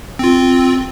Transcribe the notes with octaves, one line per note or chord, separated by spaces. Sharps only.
C4 F4